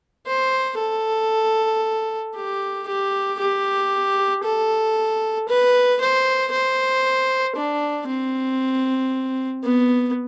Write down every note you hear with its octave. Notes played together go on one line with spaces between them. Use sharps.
C5
A4
G4
G4
G4
A4
B4
C5
C5
D4
C4
B3